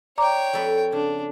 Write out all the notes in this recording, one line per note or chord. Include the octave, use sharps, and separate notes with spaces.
C#5 D5 G5 A#5 D6
F2 A4 B4
C#3 D4